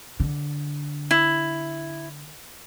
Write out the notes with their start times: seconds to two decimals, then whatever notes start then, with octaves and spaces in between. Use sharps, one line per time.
0.20 D3
1.11 E4